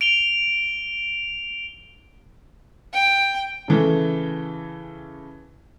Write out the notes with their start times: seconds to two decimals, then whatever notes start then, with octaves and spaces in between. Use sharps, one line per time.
0.01 D7 F7 G7
2.93 G5
3.68 C#3 E3 A3